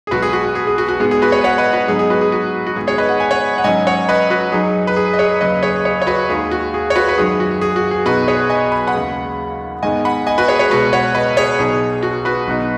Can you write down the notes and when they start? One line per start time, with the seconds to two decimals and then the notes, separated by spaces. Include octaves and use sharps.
0.07 G#4
0.11 B1 B2 G#3 F#4 B4
0.22 G#4
0.33 F#4
0.45 F#4
0.55 G#4
0.67 G#4
0.78 F#4
0.88 F#4
1.00 G#2 G#3 B3 G#4
1.11 G#4
1.22 F#4 B4
1.32 G#4 C#5
1.44 C#5 F#5
1.58 B4 D#5
1.73 F#4 B4
1.88 G#2 F#3 B3 D#4 G#4
1.99 G#4
2.10 F#4 B4
2.21 G#4
2.32 F#4
2.67 F#4
2.76 G#2 D#3 B3 G#4
2.87 G#4 C#5
2.98 B4 D#5
3.09 F#5
3.20 G#5
3.31 C#5 F#5
3.58 F#5
3.64 G#2 F#3 C#4 D#5 G#5
3.87 C#5 F#5
4.09 B4 D#5
4.30 F#4 B4
4.52 F#2 F#3 D#4 G#4
4.87 B4
4.96 G#4
5.13 D#5
5.19 G#4 C#5
5.41 D#2 C#3 F#3 B4 D#5
5.63 G#4 C#5
5.85 G#4 C#5
6.02 C#5
6.07 F#4 B4
6.29 D#2 D#3 G#3 D#4 G#4
6.51 F#4
6.74 G#4
6.90 C#5
6.96 F#4 B4
7.08 B4
7.18 F#2 D#3 G#3 G#4
7.40 F#4
7.61 G#4
7.76 F#4
7.91 G#4
8.06 B1 B2 B3 D#4 F#4 B4
8.28 G#4 C#5
8.50 D#5 G#5
8.72 B5
8.87 F#5 B5
8.94 D#2 C#3 G#3
9.83 G#2 D#3 G#3 B3 D#5 G#5
10.05 F#5 B5
10.27 D#5 G#5
10.38 F#4 B4
10.48 G#4 C#5
10.59 G#4 C#5
10.70 C#2 B2 G#3 B3 F#4 B4
10.93 C#5 F#5
11.15 B4 D#5
11.37 G#4 C#5
11.59 B1 B2 B3 D#4 G#4
12.03 F#4
12.25 F#4 B4
12.47 B1 B2 B3 D#4